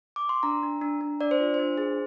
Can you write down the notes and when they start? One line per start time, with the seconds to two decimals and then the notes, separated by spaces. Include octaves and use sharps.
0.16 D6
0.29 C6
0.43 D4 A#5
0.63 D4
0.81 D4
1.01 D4
1.21 D4 D5
1.31 C5
1.40 F4
1.54 D4 C5
1.78 G#4